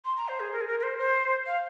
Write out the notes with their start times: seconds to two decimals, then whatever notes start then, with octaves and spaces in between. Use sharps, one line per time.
0.05 C6
0.17 A#5
0.28 C5
0.40 G#4
0.53 A#4
0.61 G#4
0.68 A#4
0.80 A#4
0.83 C5
0.99 C5
1.47 F5